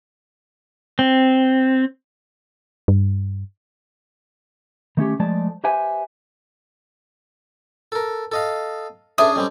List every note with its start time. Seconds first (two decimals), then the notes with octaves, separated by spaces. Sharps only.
0.99 C4
2.88 G2
4.97 D#3 A3 C#4 G4
5.20 F3 G#3 A3 D5 A5
5.64 G4 B4 C5 E5 G#5
7.92 A4 A#4
8.32 A4 D#5 F5
9.18 C#4 D4 G#4 A4 B4 E5 D#6
9.36 G3 C4 C#4 A4 D#5